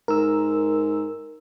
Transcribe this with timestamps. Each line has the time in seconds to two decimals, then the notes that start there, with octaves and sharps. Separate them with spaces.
0.08 G#2 A#4 E6